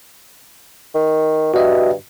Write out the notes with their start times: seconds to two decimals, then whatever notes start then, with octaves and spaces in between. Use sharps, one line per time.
0.94 D#3
1.54 G2 F#4 D#5 E5